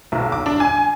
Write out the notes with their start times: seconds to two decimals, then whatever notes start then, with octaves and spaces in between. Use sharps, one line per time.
0.12 B1
0.32 D6
0.46 D4
0.60 G#5